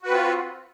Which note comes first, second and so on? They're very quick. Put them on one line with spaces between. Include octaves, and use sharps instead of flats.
F#4 B4 C4 F4